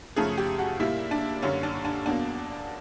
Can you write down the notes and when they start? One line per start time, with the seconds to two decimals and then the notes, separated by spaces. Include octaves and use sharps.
0.16 F#2 C#3 F3 A3 G#4
0.38 G4
0.59 F#4
0.80 A#2 G3 A#3 E4
1.11 D4
1.42 F#2 D3 G3 A#3 C#4
1.63 D4
1.85 D4
2.06 E2 B2 F#3 A#3 D4